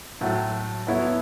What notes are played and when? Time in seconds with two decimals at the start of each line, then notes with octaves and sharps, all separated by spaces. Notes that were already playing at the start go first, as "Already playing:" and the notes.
0.21 A2 F#3 A3
0.87 F#3 B3 E4 A4 C#5